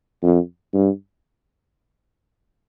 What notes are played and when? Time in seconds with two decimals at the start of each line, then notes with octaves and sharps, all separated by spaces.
0.23 F2
0.73 G2